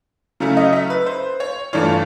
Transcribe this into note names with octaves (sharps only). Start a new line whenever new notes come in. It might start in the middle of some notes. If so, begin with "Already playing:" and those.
C#3 F#3 A3 C#4 E4
D#5
E5
B4
C5
C#5
G2 E3 A3 D4 F4 C#5